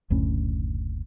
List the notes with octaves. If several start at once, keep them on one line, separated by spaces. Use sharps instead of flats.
F#1 D2 A2 C#4